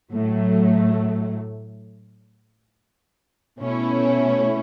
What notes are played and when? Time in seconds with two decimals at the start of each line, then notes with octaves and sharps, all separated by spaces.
0.12 A2 F#3 A3
3.59 B2 A3 C#4 E4